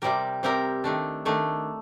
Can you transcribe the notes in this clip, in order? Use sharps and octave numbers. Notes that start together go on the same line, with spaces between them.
C3 G3 C4 G4 A#4
C3 G3 C4 G4 A#4
D#3 A3 D4
D#3 A3 D4